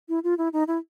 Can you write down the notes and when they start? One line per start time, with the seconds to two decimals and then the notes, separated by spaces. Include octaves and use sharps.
0.09 E4
0.24 F4
0.38 E4
0.53 D#4
0.68 E4